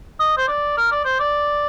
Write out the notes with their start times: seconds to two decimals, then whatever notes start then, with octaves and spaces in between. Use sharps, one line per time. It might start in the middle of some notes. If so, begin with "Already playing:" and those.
0.20 D#5
0.37 C5
0.48 D5
0.77 A#4
0.92 D5
1.05 C5
1.20 D5